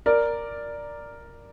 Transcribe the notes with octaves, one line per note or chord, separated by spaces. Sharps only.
A#4 D5